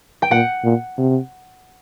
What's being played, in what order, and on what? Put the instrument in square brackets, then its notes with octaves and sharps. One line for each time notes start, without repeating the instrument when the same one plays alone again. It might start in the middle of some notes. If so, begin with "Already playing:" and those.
[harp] G5
[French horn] A#2 [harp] F#5
[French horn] A#2
C3